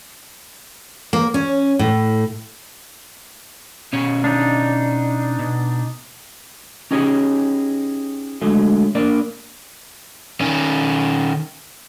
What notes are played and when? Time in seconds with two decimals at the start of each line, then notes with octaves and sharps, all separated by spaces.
1.13 A#3
1.34 C#4
1.79 A2
3.93 B2 C#4 C#5
4.24 D4 D#4
5.39 B2
6.91 C#4 D#4 G4 G#4 C#5
8.41 D3 F#3 G#3 A3
8.95 A#3 D4 A#4 D5
10.41 D#3 C#4